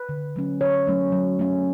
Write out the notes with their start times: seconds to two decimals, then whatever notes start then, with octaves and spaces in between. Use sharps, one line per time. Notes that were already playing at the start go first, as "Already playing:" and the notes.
Already playing: B4
0.09 D3
0.36 F#3 A3 C#4
0.61 D3 C#5
0.87 F#3 A3 C#4
1.12 F#3
1.39 A3 C#4